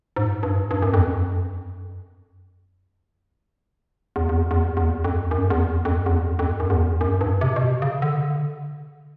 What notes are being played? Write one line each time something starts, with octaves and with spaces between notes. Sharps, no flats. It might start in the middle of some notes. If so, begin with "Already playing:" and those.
G#2
G2
G2
F#2
F2
F#2
E2
E2
F2
E2
F2
E2
F2
F#2
E2
F2
F2
E2
F2
F2
F#2
E2
F2
F#2
G2
C3
B2
C3
C#3
D3